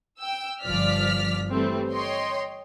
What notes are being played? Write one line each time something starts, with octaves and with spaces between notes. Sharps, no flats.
G5 E6
G1 F3 D5 F6 B6
E3 G3 A3 C4
C#5 D#5 G5 C6